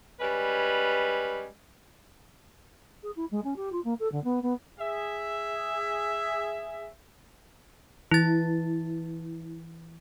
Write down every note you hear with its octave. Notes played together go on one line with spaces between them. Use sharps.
G3 G#3 C#4 B4
G#4
E4
G#3
C#4
G4
F4
A#3
A4
D3
B3
B3
G#4 E5
E3 E4 A6